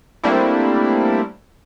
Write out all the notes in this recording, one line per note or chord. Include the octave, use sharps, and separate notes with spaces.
G3 A3 A#3 C4 D4 E4